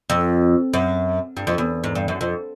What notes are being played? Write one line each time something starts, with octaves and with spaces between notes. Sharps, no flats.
F2
F#2
G2
F2
E2
G#2
G2
F#2
F2